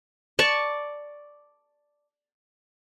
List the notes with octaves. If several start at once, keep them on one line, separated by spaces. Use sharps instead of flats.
D5 A5 C#6